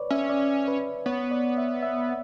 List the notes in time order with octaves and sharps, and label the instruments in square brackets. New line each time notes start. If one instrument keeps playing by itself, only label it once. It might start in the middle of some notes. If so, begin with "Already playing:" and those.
Already playing: [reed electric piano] B4 C#5 D5
[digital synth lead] C#4 [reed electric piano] E5
[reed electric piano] D5
B4
[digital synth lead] B3 [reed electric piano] C#5
[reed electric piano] D5
E5
E5